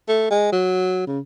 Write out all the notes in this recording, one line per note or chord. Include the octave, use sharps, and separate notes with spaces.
A3
G#3
F#3
C#3